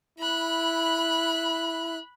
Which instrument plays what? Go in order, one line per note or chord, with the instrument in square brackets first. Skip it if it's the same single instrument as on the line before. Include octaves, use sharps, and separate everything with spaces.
[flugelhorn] E4 [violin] B5 F#6